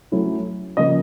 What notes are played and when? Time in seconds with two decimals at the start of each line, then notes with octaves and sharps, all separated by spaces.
0.12 F#3 A3 C#4 E4
0.77 C#3 F3 A#3 C#4 D#5